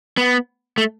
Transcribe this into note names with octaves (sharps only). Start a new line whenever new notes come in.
B3
A3